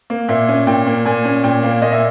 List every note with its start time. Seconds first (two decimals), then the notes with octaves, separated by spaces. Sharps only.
0.10 A#3
0.28 A#2 E5
0.49 C#4
0.67 A#2 G5
0.87 A#3
1.05 A#2 G#5
1.25 C#4
1.44 A#2 G5
1.63 A#3
1.82 A#2 D#5
1.92 E5